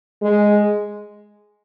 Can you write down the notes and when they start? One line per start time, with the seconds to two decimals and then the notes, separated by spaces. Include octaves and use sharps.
0.22 G#3